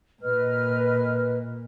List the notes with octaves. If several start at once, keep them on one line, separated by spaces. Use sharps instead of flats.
A#2 B4 D#5 F6